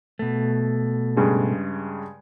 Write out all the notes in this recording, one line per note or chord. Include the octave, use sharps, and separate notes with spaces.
B2 A3
G2 C#3 G#3